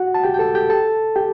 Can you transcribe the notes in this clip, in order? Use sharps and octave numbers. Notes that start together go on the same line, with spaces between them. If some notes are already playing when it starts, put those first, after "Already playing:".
Already playing: F#4 F#5
A5
G4 G5
G5
A4 A5
G4 G5
A4 A5
G4 G5